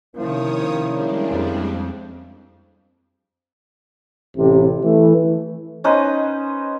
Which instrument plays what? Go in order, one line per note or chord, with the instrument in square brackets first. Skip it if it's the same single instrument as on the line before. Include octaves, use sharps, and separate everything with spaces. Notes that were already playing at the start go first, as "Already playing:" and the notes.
[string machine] C3 C#5 D#6 [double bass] D#3 F3 [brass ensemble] A#3 C#4 E4
[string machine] G3 G#3 D4
[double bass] F2
[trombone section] A1 C3
E3 A3
[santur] C#4 D#4 B4 C5